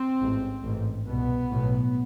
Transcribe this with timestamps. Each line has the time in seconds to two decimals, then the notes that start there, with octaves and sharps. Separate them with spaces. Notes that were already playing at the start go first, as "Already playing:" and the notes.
Already playing: C4
0.20 A1 G#2
0.63 A1 G#2
1.06 C2 B2 B3
1.50 B1 A2